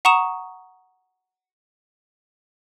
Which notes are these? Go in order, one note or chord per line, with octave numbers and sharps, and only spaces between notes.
F#5 A#5 C#6 D#6 E7